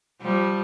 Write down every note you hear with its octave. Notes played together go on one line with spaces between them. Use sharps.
F3 G3